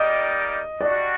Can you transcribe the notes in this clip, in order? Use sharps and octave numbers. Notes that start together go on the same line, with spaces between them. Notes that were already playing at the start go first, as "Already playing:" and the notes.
Already playing: G3 A#3 D#4 G4 D5 D#5
G3 D4 F#4 D5